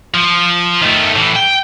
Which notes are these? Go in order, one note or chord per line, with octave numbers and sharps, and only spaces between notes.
F3
D#3 A3
A2 E3
G5